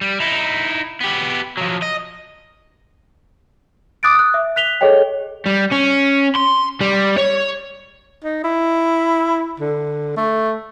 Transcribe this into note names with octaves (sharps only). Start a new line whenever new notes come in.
G3
D#4 E4
B3 G4
F3 F#3
D#5
D6 D#6 F#6 A6 D7
D#6 F#6
E5
F#6 B6 F7 G7
G#4 A4 C#5 D#5 G5
G3
C#4
C6
G3
C#5
D#4
E4
D3
A3